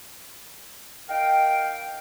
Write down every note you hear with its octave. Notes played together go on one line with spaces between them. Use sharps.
D#4 A#4 F5 G5